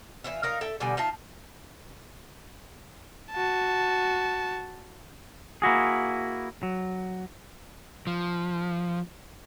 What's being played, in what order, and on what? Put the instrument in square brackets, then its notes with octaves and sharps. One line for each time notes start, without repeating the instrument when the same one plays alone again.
[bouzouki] E3 F4 E5
D#4 A#4 F5
A4 E5 G5
B2 D3 G3 G#5
D#4 F4 E5 A5
[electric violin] F#4 A5
[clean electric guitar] A#3 E4 F#4 G#4
F#3
[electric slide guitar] F3